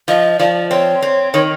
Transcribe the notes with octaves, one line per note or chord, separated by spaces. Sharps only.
F3 D#5
F3 D5
C4 C#5
C4
D#3 C#5